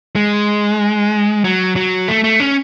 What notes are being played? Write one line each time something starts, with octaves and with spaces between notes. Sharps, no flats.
G#3
F#3
F#3
A3
A3
C#4